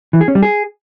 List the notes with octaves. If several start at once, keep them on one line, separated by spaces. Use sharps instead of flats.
E3
G#4
C#4
G3
G#4